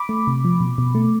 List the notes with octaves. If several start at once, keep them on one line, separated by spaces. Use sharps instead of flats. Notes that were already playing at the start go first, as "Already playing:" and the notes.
Already playing: B5 D6
A3
C3
F3
B2
B2
A3